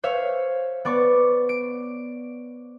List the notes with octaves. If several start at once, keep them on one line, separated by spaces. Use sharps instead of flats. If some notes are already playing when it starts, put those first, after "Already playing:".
C5 C#5 E5 F5
B3 D5 C#6
D7